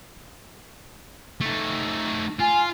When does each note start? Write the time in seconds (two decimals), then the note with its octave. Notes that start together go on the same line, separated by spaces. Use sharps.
1.41 A3 D#4
2.40 F4 G#5